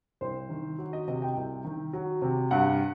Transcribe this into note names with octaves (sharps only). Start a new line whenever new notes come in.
C2 C5
D#3
F#3
D#5
C3 D#5
G5
C2
D#3
F#3
C3
G2 F#5